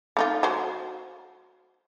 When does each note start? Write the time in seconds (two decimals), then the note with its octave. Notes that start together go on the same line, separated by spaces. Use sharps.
0.17 A3 D#4 F4
0.43 F#3 C5